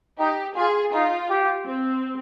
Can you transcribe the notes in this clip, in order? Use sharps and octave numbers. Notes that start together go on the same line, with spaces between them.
D#4 G4
F4 G#4
D#4 F4
G4
C4